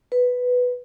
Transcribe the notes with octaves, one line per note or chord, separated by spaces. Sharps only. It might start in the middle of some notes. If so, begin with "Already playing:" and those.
B4